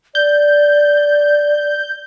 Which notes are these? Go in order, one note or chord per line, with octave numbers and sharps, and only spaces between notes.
D5 G6